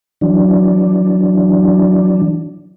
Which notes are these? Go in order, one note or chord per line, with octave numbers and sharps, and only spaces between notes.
E3 F#3 D4